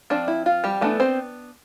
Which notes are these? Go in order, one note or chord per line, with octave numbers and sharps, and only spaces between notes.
F3 C4 D4 D5
E4
F4
G3 G4
E3 A3 B3 D4 A4
C4 C5